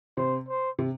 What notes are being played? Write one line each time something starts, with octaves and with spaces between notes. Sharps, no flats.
C3 C5
C5
C3